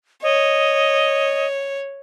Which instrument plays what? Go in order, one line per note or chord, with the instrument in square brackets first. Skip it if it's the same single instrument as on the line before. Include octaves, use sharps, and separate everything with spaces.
[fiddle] C#5 [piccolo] D#5